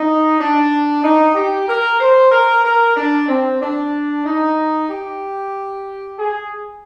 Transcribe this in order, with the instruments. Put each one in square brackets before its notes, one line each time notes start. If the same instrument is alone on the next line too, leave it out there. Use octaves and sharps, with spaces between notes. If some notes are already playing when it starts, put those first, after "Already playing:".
Already playing: [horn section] D#4
D4
D#4
G4
A#4
C5
A#4
A#4
D4
C4
D4
D#4
G4
G#4